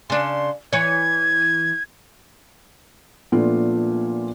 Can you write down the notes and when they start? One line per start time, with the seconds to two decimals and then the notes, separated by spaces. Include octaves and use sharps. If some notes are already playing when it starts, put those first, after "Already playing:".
0.10 C#3 D4 C6
0.73 E3 C#5 G#6
3.32 A#2 F3 A3 B3 D4 F4